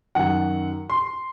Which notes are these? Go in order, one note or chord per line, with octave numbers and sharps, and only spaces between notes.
F#2 D#3 F#3 F#5
C6